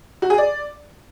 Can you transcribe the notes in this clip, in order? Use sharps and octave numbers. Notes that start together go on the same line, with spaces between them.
F#4
G#4
D5